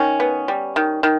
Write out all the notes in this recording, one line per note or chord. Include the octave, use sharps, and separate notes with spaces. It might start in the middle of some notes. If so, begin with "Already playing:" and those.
Already playing: D#3 C#4
B3
G3
D#3
D#3